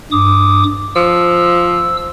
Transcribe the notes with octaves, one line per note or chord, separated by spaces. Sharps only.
G2 D6 D#6
F3 E6